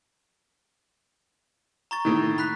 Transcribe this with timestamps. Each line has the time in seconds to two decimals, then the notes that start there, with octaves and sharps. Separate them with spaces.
1.91 A#5 C#6 A6
2.05 A2 D#3
2.38 B5 F#6 B6